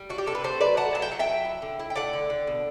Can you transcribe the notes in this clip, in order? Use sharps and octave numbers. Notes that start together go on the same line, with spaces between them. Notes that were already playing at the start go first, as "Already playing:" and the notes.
Already playing: G3
D4 F#4
G4
C3 A4
B4
A3 A4 C5
F#3 B4 D5
A3 F#5 A5
F#3 A5
G5
F#3 F#5
E5 G5
F#3
E4
D3
E4
G5
A3 D5 F#5
D3
D3
B2